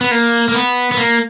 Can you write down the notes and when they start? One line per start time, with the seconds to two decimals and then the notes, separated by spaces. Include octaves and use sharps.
0.01 B3
0.11 A#3
0.49 A#3
0.55 B3
0.92 B3
0.97 A#3